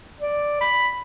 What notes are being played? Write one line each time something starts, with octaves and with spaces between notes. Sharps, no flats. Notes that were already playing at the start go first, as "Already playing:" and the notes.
D5
B5